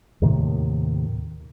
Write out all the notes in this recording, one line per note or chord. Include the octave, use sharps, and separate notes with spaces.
D#2 A2 C3 D#3